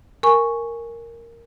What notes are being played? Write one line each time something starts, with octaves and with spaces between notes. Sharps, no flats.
A#4 G#5 C#6